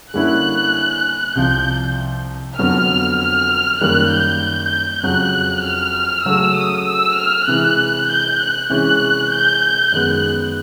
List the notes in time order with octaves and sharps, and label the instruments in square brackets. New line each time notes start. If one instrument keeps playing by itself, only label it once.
[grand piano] D3 G3 A#3 C#4 E4 [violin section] F#6
[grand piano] C2 C3 F3 [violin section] G6
[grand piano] F2 D3 F#3 B3 [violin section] F6
[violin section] F6
[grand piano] F#2 D#3 G3 A#3 [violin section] F#6
[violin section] G6
[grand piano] F2 C#3 F#3 [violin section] F#6
[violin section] F6
[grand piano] C#3 F#3 A3 C#4 [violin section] E6
[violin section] D#6
E6
F6
[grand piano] C3 E3 G#3 [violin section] F#6
[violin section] G6
F#6
[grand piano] C3 E3 G#3 C#4 [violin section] F#6
[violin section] G6
[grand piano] F#2 D#3 G#3 B3 [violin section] F#6